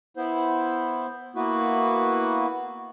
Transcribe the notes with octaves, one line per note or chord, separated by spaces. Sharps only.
B3 E4 C5
A#3 B3 E4 F#4 B4